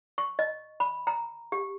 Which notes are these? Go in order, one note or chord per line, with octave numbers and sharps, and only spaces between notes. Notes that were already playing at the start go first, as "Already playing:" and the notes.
C#6
D#5
B5
A#5
G4